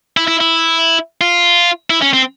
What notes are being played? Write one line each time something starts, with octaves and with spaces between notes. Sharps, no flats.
E4
E4
E4
F4
E4
C#4
C4